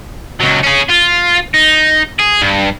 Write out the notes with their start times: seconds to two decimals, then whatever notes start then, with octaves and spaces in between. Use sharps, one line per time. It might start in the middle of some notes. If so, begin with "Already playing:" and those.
0.41 C#2 F#3
0.64 C#4 G#4
0.90 F4
1.54 D#4
2.19 G#4
2.42 G2